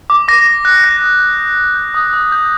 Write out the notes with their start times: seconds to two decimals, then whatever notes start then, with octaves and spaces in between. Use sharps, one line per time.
0.10 D6
0.28 D6 A#6
0.47 D6
0.65 F#6
0.83 G6 A#6
1.02 D#6
1.20 G6
1.39 D#6
1.58 G6
1.76 G6
1.94 D#6
2.13 D#6
2.32 G6